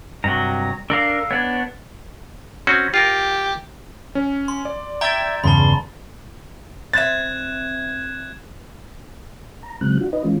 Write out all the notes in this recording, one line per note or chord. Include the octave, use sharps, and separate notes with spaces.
G2 C3 F#3 A#5
D4 A4 A#4 F5
B3 D4 C#5
C4 C#4 F#4
F4 G4 A#4
C#4
C6
D5
E5 G5 A#5 G#6 A6
E2 G2 C#3 A5 B5 C6
C4 E5 F#6 G#6 A6 E7
A#5
C#3 F#3 G#3 C4 F#6
D4 F4 F#4
D#4 B4 D#5
E3 G#3 C#4 F4